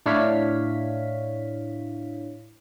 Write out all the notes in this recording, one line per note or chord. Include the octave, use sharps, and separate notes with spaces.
A2 D4 E4 C#5 F5 B6